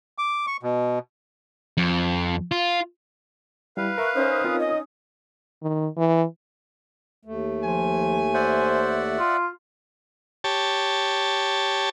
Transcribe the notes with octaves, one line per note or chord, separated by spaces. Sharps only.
D6
C#6
B2
F2
F4
G3 E4 B4 F5
A#4 E5 C#6 F#6
C#4 D#4 C5 D#6
C4 F4 A#4
D#5
D#3
E3
D#2 A3
F3 G#5
C5 D5 E5 F#5
F4
G4 C#5 A5